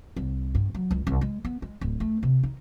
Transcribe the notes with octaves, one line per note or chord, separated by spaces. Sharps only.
C2
G2
F#3
C#2
C2
G#3
B3
G#3
D1
A3
C3
D#4